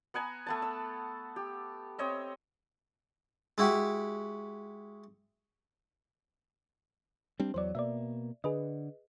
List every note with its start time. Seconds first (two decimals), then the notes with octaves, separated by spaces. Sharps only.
0.14 B3 F#5 G#5 A#5
0.46 A3 B3 A5
0.62 E6
1.36 G4
1.99 C4 C#5 D#5 E5
3.58 G#3 E4 F#4 G4
7.40 G3 C4 D4
7.54 E2 F#3 C5 D5
7.75 B2 A#3 D5 E5
8.44 D3 G#4 B4 D#5